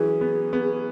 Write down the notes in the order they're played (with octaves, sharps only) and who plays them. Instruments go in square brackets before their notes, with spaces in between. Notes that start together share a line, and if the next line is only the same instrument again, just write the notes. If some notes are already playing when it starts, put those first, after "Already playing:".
Already playing: [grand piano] E3 F#3 C#4 [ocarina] G#4
[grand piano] B3
B3